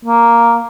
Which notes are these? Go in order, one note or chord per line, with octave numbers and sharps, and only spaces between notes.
A#3